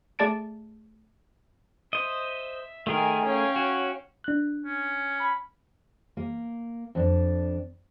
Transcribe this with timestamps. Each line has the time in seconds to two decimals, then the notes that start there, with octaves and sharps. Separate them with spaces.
0.19 A3 G#4 D5 A5 A6 D7
1.93 C5 D#5 E5
2.87 D#3 A3 G#4 A#4 G#5
3.26 C#4 C#5 F5 G5
3.56 F#4
4.24 D4 F#6
4.65 C#4
5.19 B5
6.17 A#3
6.95 F2 D4